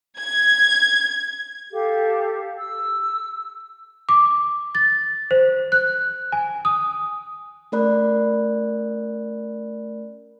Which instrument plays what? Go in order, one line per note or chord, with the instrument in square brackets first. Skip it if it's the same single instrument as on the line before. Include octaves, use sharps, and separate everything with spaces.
[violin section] G#6
[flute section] G4 A4 F5
E6
[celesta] D6
A6
C5
F#6
G#5
D#6
[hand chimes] A3 C#4 A#4 D5 B5 F#6